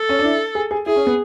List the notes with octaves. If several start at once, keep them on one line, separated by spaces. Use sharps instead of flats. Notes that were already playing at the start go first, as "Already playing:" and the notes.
Already playing: A4
C#4
D4
E4
G#4
G#4
E4 G#4
C#4
B3